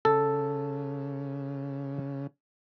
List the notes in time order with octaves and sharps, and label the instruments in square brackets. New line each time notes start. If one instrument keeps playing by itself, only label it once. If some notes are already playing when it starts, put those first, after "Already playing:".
[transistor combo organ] C#3 [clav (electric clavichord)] A4